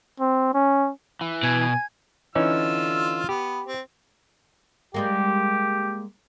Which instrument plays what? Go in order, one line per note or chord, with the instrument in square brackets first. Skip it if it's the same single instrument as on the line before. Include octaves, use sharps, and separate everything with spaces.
[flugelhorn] C4
C#4
[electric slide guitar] E3
[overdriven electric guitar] B2 [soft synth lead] G#5 [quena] G#6
[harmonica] D3 F4 E6 [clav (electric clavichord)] E3 C#4 D#4
[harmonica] B3 [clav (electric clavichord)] G4
[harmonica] C4
[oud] G3 G#3 A#3 [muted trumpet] G4